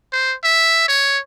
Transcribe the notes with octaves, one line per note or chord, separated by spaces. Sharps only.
C5
E5
C#5